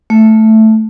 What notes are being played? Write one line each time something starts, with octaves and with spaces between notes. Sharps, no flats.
A3